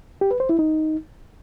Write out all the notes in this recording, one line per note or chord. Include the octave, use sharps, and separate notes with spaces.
G4
B4
C5
E4
D#4